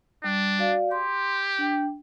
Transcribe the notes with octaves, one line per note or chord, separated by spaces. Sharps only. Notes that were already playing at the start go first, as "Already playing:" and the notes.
G3 D4
F#4 D5 F5
G4 C6
D4 G5